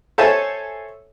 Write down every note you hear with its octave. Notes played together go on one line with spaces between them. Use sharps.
A4 C5 C#5 E5 G#5 A5